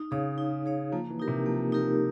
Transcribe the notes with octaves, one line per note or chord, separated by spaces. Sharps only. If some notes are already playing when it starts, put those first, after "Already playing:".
Already playing: D#4
C#3 G#4 C#5 F5
D#4
G#4 C#5 F5
F3 A#3
E3
D#4 G4 A#4
C3
F3 A#3
D#4 G4 A#4